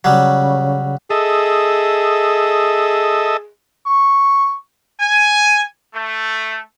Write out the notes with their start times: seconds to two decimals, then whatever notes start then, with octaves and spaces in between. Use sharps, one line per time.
0.04 C#3 F#3 G3
1.10 G#4 A4 D#5 E5
3.86 C#6
5.00 G#5
5.94 A3